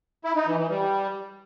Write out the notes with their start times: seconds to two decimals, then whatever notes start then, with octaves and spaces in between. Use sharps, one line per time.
0.24 E4
0.36 D#4
0.47 E3
0.58 E3
0.69 G3